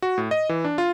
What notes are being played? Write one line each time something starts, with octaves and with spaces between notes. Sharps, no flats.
F#4
A2
D#5
E3
D4
F4